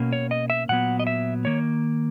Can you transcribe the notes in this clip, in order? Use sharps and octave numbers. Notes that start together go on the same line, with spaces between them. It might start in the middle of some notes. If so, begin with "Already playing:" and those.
Already playing: B2 A#3 C#4
C#5
D#5
E5
A#2 F#3 B3 F#5
D#5
E5
D#3 A#3 C#5